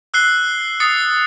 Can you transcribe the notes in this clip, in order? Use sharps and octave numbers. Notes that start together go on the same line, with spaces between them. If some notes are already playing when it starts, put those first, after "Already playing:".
E6 F#6 C7 G7
D#6 A6 C7 C#7